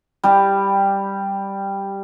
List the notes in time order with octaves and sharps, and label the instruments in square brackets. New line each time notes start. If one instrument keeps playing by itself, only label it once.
[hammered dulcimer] G3 G4